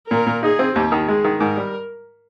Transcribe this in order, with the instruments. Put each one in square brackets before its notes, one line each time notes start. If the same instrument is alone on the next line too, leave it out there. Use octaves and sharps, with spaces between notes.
[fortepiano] A#2 [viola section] A#4
[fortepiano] A#2
[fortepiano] D#4 [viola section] G#4
[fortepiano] C4
[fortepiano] D#2 [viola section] G4
[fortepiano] D#3
[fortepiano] G#3 [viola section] G#4
[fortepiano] D#3
[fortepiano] G#2 [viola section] A#4
[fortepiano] G3